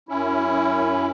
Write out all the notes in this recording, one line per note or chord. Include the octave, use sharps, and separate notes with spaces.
F#2 C#4 E4